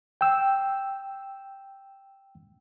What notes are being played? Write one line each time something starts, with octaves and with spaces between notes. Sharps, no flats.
G5 E6